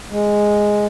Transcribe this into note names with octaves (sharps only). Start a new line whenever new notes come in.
G#3